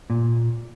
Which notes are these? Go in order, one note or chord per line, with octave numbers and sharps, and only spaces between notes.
A#2